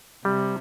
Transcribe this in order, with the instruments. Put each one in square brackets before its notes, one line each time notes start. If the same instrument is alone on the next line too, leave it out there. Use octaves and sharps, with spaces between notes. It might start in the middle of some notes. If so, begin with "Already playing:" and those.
[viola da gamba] C3 [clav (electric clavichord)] G3